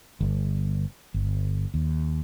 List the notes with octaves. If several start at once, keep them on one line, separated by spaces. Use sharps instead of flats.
G1
G1
D#2